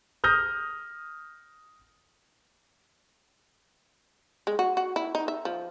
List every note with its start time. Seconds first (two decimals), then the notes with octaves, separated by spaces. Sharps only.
0.24 D#6 F6 G6 A#6
4.47 G#3
4.59 F#4
4.77 F#4
4.96 E4
5.15 D#4
5.28 E5
5.45 F3